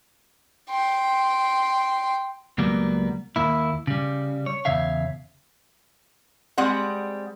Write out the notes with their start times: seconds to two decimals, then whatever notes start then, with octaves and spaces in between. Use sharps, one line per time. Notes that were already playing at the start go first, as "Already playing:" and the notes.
0.70 G5 C6
2.58 C#2 F#3 G3 A#3 B3
3.36 D#2 A#3 E4
3.87 C#3 G3
4.46 C#5
4.65 E2 G#2 C#3 C#5 E5 F5
6.58 G3 G#3 C4 F#5